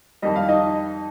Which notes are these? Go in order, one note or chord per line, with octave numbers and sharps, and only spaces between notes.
F2 D#3 G3 D#5
F5
D#4 D#5